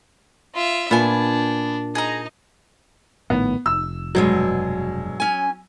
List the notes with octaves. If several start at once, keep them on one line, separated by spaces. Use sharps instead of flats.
F4 E5
A#2 B3 D4 G#5
D#4 G#4 A#5
A#1 A2 D#3 B3
F1 E6
G2 B2 F#3 G#3
C#4 G#5